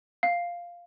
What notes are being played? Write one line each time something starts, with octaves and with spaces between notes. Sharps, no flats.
F5